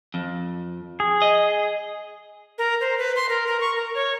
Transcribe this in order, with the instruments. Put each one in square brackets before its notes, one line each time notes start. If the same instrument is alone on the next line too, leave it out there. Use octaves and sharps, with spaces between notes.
[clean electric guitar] F2
[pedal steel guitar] G#4
[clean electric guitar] D#5
[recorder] A#4
C5
B4
C6
A#4
A#4
C#6
A#4
C#5